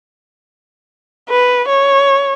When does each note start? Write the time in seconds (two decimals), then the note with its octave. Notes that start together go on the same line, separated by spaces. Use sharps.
1.29 B4
1.68 C#5